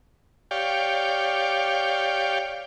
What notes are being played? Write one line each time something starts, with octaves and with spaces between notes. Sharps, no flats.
G4 C#5 D5 F5 G5